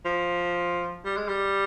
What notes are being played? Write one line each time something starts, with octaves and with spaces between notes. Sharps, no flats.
F3
G3
G#3
G3